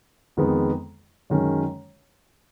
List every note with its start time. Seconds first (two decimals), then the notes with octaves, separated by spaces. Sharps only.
0.37 F2 D#3 G#3 B3
1.30 F#2 D#3 G#3 C#4